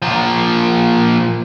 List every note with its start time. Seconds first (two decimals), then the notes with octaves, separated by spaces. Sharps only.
0.02 A#2 F3